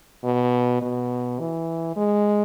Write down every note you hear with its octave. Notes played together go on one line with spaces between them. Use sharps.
B2
B2
E3
G#3